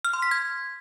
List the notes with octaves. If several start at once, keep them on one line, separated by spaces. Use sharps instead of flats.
F6
C6
B6
G#6